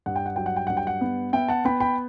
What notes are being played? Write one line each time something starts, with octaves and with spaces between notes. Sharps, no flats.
G2 F#5
G5
F#5
F#3 G5
F#5
G5
G2 F#5
G5
F#5
B3
B3 E5 G5
F#5 A5
B3 G5 B5
G5 B5